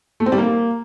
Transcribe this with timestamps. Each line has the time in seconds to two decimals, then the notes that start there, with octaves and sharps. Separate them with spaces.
0.20 A3
0.26 C4
0.32 G3
0.38 A#3